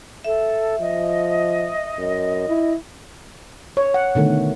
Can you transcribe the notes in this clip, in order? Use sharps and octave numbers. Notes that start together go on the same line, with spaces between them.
A4 E5
F3 D#5
F#2
E4
C#5
F#5
B2 D3 D#3 A3